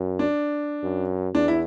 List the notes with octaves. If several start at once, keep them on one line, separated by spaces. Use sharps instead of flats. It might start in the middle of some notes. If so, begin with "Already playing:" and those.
Already playing: F#2
D4
F#2
E2 D4
E4